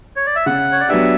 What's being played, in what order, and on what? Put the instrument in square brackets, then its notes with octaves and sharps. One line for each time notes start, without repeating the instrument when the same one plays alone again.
[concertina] C#5
D5
E5
[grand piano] C#3 [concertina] F#5
[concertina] C#5
D5
[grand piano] F#3 B3 D4 G4 [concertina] E5